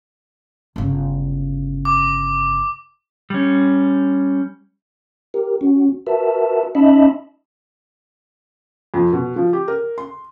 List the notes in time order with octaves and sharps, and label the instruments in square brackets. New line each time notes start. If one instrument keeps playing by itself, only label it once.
[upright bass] G1 C#3
[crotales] D6
[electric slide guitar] G3 C#4
[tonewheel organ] G4 A#4
C#4 F#4
F#4 A#4 B4 E5 A5
C#4 D#4 D#5 E5 A5 B5
[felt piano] F2
B2
F3
G4
A#4
C6